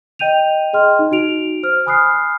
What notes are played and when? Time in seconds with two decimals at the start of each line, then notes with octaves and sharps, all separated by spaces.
0.19 D#5 G5 G6 D#7 F7
0.73 G#4 D#5 G5 C6 F6
0.99 D#4
1.11 D#4 F#4 D7 F7
1.63 C5 F6
1.86 G#5 B5 D#6 F6 F#6 C7